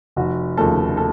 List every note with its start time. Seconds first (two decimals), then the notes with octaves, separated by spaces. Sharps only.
0.16 F1 F#4
0.57 D#2 C#3 F3 A3 A4
0.97 A4